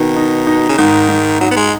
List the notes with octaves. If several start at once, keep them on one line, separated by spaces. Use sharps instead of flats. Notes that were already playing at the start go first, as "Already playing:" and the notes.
Already playing: B2 D#3
D#4
D#4
C#3
G#2 D#3
G#2
F#3 D#4
B3
G#3